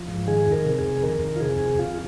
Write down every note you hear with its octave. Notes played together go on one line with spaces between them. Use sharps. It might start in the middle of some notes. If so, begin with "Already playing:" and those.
Already playing: F3
G#2
D#3 G#4
F2
A#4
C3
G#4
F2
D#3 A#4
F2
F4
C3 G#4
F2
F2 F4